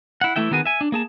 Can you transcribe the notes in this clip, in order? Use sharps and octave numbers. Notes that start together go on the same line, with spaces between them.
E4 F#5
E3 A3 E4 E5 G5
D#3 B3 F#4 G#4 G#5
E5 G#5
D4
A#3 G#4 A5